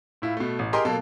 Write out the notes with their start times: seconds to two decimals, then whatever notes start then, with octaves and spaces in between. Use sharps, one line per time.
0.22 A2 E4 F4
0.37 B2 A3
0.59 A1
0.73 G4 G#4 A#4 D#5 A#5 C6
0.85 B2 F#3 A#3 A4